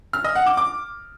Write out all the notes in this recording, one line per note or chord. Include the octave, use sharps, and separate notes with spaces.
F6
D#5
F#5
D6
D6